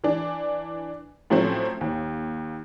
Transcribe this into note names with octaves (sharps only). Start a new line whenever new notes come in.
E3 D4
A2 F3 F#3 A3 C4 C#4
D#2